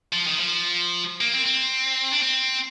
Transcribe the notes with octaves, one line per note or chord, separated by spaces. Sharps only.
F3
D#3
F3
A#3
C4
C4
D4
C4